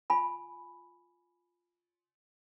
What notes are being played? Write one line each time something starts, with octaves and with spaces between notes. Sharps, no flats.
F4 G#5 B5